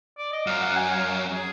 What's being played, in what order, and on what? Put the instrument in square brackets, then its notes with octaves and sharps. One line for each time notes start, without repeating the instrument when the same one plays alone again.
[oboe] D5
D#5
[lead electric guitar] F#2 [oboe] F5
[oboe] F#5
G#5
F5
G#4